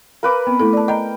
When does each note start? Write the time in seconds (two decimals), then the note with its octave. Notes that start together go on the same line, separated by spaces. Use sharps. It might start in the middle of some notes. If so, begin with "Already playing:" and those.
0.23 A#4 B4 F5 D6
0.47 B3 C4
0.60 A3 E4 A4
0.73 D5 A5
0.88 D#5 G5 A#5